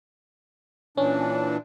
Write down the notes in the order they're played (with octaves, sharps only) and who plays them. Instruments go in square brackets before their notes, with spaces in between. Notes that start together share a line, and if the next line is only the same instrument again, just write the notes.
[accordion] A#2 E3 D4 [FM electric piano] C#4